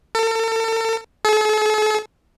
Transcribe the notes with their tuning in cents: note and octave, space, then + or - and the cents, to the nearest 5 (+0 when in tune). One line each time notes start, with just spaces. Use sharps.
A4 +40
A4 -45